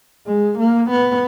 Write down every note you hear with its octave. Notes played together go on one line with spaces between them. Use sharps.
G#3
A#3
B3